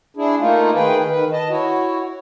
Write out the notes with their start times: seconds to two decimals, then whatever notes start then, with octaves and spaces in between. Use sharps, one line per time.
0.17 D4 E4 G#4
0.39 A3 A#3 D#4 F4
0.74 D#3 G#4 B4 G5
1.10 D#3 B4
1.32 D#5 A5
1.50 E4 F#4 C#5